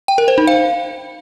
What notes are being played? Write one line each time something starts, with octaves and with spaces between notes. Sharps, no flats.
G5
A#4
C5
D#4
F5